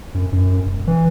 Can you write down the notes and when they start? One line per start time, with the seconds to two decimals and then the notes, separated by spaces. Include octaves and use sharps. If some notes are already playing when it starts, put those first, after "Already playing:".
0.15 F#2
0.33 F#2
0.66 E1
0.88 E3